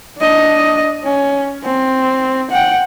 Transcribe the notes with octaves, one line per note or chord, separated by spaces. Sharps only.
D4 D#5
C#4
C4
F#5 G5